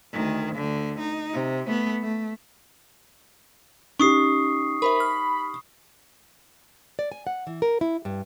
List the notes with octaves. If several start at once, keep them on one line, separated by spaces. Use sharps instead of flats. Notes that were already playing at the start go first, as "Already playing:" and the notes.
D2 D#3
D2 D3
D#4
C3
A3 B3
A3
C#4 D#4 G4 C#6 D#6 C7
A#4 C5 E5 B5
F6
D5
G#5
F#5
E3
A#4
E4
G2